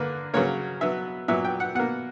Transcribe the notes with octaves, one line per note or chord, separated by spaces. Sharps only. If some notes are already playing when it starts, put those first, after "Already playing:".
Already playing: D3 A#3 B4
C#3 F#3 A#3 C#5
B2 F#3 B3 E5
A#2 F#3 B3 E5
G5
F#5
B2 A#3 F#5